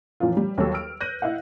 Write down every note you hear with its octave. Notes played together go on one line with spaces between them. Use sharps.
F#2 A#2 E3 F3 F4
G3
D#2 F#3 G3 A4 E6
F6 D7
F#6 G6 A#6 D#7
E4 D#5 F5 F#5